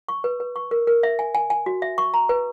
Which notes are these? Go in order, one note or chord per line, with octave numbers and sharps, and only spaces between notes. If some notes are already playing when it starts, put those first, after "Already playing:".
C#6
B4
B4
C#6
A#4
A#4
E5
G#5
G#5
G#5
F#4
E5
C#6
A#5
B4